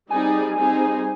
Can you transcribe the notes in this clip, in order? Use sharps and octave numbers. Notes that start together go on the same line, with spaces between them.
G3 C4 D#4 G#4 D5 G#5
G3 C4 D#4 G#4 C5